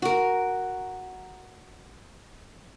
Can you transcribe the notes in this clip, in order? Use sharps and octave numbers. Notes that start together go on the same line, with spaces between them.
F#4 A#4